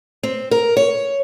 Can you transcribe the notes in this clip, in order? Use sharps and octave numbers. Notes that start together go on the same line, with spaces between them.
C4
A#4
C#5